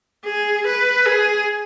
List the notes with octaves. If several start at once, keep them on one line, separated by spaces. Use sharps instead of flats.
G#4
B4
G#4